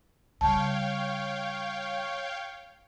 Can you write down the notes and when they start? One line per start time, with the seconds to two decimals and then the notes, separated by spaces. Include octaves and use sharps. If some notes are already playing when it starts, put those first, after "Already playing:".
0.41 C#3 G3 C#5 F5 G5 A5